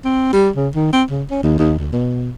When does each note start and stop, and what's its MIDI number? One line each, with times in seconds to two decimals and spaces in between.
0.04 0.29 60
0.33 0.50 55
0.56 0.69 49
0.75 0.90 51
0.93 1.04 60
1.10 1.23 49
1.31 1.42 61
1.43 1.56 39
1.59 1.75 39
1.79 1.89 38
1.93 2.31 47